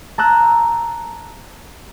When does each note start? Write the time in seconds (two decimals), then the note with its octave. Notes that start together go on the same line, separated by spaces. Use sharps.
0.18 A5 A#5 E6 F#6 G6